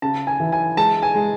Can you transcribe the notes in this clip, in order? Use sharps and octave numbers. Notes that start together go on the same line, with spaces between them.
C#3 A5
G#5
E3
G#5
G#3 A5
G#5
G#3